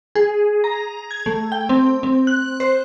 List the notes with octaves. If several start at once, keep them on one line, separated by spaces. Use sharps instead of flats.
G#4
A#5
G#6
A3
G5
C4
C4
F#6
C5